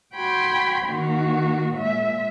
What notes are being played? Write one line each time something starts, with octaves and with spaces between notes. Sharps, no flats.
F#4 G5 B5 C6 G6 G#6
D#3 A#3 F#4
A#2 G#3 E5